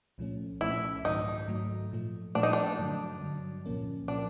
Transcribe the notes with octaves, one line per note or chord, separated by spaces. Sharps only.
C2 A#2 F3 A3 C#4
C2 A#2 F3 A3 C#4 E4
G#2 D#3 F#3 A3 D#4
G#2 D#3 F#3 A3
A#2 F3 A3
A#2 F3 A3 D4
D#4
D4
G2 D3 F#3
G2 D3 F#3
C2 A#2 F3 A#3 C#4
A#2 F3 A#3 C#4 D4